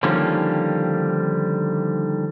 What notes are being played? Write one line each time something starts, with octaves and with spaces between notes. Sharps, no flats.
D3 D#3 F3 G3 A#3 C#4